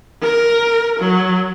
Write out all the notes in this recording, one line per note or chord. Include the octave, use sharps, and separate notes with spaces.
A#4
F#3